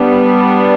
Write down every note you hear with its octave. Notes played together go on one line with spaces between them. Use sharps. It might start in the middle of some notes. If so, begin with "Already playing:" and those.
Already playing: G3 B3 D4